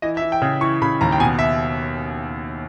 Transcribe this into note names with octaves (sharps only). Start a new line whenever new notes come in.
E3 D#5
E5
E3
G5
C#3
E3 C#6
C#3 B5
D#2 A#5
G5
B2 G#5
E5